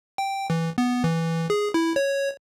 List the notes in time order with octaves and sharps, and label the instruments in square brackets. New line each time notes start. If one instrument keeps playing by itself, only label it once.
[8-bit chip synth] G5
E3
B3
E3
G#4
E4
C#5